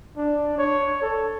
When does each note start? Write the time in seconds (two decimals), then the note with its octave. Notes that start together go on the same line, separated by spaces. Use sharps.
0.17 D4
0.58 C#5
1.02 A4